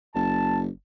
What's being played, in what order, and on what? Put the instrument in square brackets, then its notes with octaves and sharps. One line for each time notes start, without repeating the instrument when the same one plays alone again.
[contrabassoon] F#1 [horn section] A5